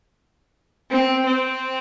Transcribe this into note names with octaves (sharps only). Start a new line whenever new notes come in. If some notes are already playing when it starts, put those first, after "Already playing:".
C4
C4